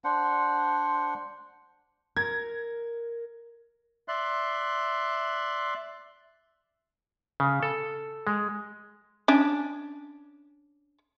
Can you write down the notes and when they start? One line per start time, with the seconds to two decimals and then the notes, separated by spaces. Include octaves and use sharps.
0.04 D4 C5 F#5
2.17 A#4 G#6
4.08 D5 E5 C6 F#6
7.40 C#3
7.63 A4
8.27 G#3
9.28 C#4 D4